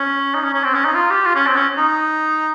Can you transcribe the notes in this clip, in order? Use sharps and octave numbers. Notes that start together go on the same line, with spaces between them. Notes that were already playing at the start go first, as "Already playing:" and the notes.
Already playing: C#4
D#4
C#4
C#4
C4
C#4
D#4
F4
G4
F4
C#4
C4
C#4
D#4